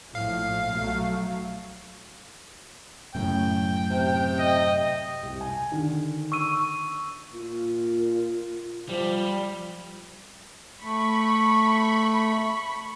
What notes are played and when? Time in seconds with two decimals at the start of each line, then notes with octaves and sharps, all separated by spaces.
0.15 A#1 A2 F3 F5
0.72 B1 F#3 A3
3.15 F#2 A2 C#3 G5
3.90 C3
4.40 D#5
5.23 C2
5.41 G#5
5.71 D3 D#3
6.32 C#6 E6 D#7
7.33 A#2 F4
8.89 F3 G3
10.83 A3 B5 C#6